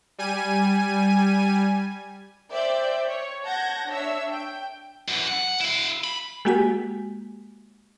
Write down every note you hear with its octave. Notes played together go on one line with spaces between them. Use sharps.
G3 G#5 D#7
C5 D5 E5 G5 G6
C#5
F#5 A5 G6 G#6 A#6
D4 C#5 E5 E6
G5
F#2 E3
F#5
E4 F5
B5
G#3 A#3 F#4 G4 G#5 B6